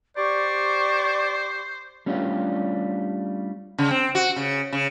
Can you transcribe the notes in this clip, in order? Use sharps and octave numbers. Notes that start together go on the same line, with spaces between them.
G4 C5 D5 C#6
G3 A3 C#4 D4 F4 G4
C#3
C4
F#4
C#3
C#3